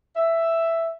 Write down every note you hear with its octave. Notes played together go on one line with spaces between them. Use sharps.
E5